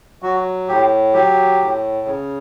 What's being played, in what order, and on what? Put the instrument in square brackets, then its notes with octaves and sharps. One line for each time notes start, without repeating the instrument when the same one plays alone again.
[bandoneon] F#3 F#4
A2 G4
F#3 G4
A2
C#3